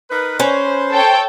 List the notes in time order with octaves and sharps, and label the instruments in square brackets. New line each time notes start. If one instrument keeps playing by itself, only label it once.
[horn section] D#4 A#4 B4
[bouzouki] C#4 B4 [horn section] C5
[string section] A4 C#5 G5